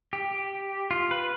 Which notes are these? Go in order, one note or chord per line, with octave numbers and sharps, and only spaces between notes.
G4
F4
B4